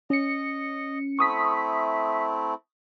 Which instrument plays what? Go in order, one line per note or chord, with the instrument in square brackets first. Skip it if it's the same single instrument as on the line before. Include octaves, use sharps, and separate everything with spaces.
[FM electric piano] C#4 C#7 [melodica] D#5
[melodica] A3 C4 E4 [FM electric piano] C#6 D#6 B6